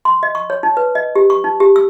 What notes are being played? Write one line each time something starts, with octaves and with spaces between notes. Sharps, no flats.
C6
D#5
C#6
C#5
D#4
B4
D#5
G4
C#6
D#4
G4
E6